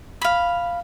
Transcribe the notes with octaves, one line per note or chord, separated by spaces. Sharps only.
F5 B5